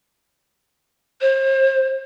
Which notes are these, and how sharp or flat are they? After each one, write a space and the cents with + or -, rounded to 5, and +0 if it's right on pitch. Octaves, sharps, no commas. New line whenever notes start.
C5 +40